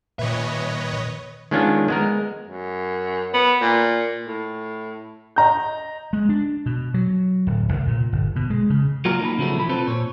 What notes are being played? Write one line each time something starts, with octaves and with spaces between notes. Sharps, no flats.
A#2 D#3 B4 C#5 D#5 E5
D#3 G#3 B3 C#4 D4 F4
G#3 B3 A#4
F#2
B3
A#2
A2
D#5 A#5 G6
G#3
D4
B2
F#3
D1
C2
A#2
G1
B2
G#3
C#3
F#3 A#3 F4 F#4 A#4
A#3 D#4 A5 B5
C#3 F3 F#3 A3 B3
B1 E3 B5
C4 F4 A4 B4 C5
A#2 C#5